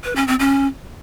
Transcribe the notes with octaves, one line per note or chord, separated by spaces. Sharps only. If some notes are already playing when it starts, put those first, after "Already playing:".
B4
C#4
C4
C#4